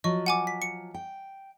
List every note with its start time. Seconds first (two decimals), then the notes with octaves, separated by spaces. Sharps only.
0.04 F3 F#3 D#5 C#6
0.26 F#5 G#5 D6
0.47 B6
0.62 C#7
0.94 G5